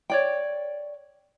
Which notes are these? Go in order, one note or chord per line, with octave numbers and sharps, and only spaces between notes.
C#5 D5 G5